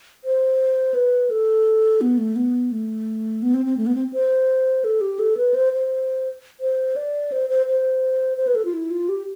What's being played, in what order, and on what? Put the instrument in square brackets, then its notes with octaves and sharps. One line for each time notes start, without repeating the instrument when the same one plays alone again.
[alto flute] C5
B4
A4
B3
A3
B3
A3
B3
C4
C4
A3
B3
C4
C5
A4
G4
A4
B4
C5
C5
C5
D5
C5
C5
C5
C5
B4
A4
F4
E4
F4
G4